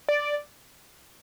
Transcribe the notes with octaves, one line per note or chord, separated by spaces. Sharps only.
D5